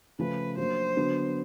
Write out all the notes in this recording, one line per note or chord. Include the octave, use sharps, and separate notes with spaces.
C#3 F3 A3 C#4 F4 B4
F#3 A#3 D4 F#4 C5
D3 F#3 B3 D4